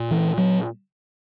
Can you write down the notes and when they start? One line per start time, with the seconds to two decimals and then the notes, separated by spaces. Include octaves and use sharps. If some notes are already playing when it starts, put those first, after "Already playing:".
Already playing: A#2
0.11 E3
0.38 F#3